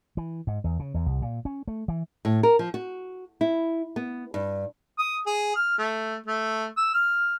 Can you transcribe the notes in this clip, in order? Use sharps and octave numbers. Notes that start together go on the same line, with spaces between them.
E3
G#2
E2
C#3
E2
C2
A#2
C#4
A3
E3
A2
A#4
F3
F#4
E4
B3
G2
D#6
G#4
F6
A3
A3
E6
F6